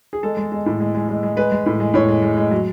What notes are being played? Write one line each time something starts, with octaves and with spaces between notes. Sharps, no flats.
G#4
G#3 A4
G#3
G#3
A2
G#3
G#3
G#3
G#3
G#3 B4
G#3
A2
G#3
A2 C#5
G#3
G#3
G#3
F#3